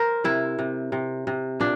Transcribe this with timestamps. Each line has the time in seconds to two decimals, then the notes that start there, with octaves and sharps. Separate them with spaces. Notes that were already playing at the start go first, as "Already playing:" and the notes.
Already playing: A#4 C5
0.24 C3 E4
0.59 C3
0.92 C3
1.27 C3
1.60 A#2 D4